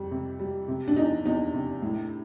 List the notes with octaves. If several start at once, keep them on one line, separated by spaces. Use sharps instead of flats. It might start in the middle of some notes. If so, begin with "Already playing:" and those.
Already playing: F2 G3
C3
G3
C3
D4
E2 D#4
E2 D#4
C3
A2